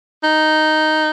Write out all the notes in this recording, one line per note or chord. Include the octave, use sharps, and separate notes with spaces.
D#4